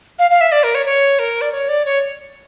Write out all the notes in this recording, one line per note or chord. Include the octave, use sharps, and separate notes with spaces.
F5
F5
E5
D5
A#4
C#5
C#5
A#4
D5
C#5
D5
C#5